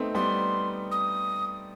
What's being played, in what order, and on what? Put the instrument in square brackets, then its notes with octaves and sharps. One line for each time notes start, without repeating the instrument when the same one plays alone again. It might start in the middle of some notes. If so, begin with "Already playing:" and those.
Already playing: [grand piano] A3 B3 C4 D#4
[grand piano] G3 B3 [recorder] C6
[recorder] D#6